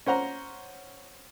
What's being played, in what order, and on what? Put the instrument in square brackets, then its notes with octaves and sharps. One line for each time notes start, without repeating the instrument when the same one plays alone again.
[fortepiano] C#4 C5 F#5 A#5